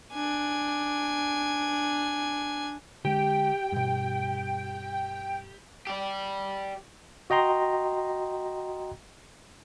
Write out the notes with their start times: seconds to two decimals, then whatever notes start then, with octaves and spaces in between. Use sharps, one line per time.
0.13 D4 G#5
3.05 D3 G#3 G4 G5
3.72 G2 B2
5.87 G4 D5
7.30 F#4 D#5 G5 A#5 C6